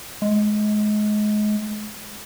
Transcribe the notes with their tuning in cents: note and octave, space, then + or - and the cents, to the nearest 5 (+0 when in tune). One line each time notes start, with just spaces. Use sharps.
G#3 +25